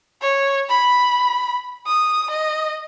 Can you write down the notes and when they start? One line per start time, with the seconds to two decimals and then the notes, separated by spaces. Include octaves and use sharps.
0.21 C#5
0.69 B5
1.87 D#6
2.30 D#5